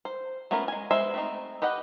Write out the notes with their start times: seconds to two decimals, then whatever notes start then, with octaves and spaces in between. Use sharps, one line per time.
0.05 C5
0.51 A3 B3 C#4 F4 A#4
0.68 G#3 G#5
0.91 G#3 B3 C5 E5
1.14 A3 C4 D#4
1.62 G4 B4 D#5 F#5